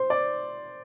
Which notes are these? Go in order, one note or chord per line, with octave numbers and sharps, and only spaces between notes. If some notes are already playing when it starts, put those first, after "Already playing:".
Already playing: C5
D5